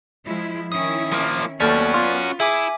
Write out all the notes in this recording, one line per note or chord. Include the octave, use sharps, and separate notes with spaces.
F3 G#3 E4
D#3 C#4 E4 D#6
F3 A#3
D#2 A3 B3 C#4 F#4 D5 F6
F4 C6
E4 G#4 E5 G#5 D6